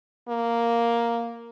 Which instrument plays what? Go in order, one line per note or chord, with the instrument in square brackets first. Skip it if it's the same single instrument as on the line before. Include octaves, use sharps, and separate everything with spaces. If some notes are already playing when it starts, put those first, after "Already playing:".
[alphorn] A#3